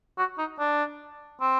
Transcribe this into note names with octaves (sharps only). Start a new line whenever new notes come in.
F#4
D#4
D4
C4